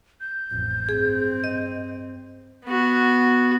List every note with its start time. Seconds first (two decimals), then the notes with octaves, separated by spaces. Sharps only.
0.21 G6
0.51 A1 F2
0.89 G2 C4 G#4
1.44 D#5
2.65 B3 F#4